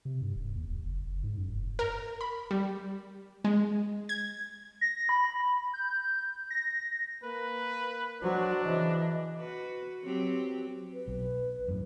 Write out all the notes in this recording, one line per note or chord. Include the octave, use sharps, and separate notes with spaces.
C3
G2
D#1
D#2
D1
F#1
F#1
G#2
F#2
F1
A#4
B5
G3
G#3
G#6
A#6
B5
G6
A#6
A#3 B4
F#3 D4 F#4 C5
C#3 E3 D#5
F#4 B4
F#3 C4 G4
B4
B1
F#2 A2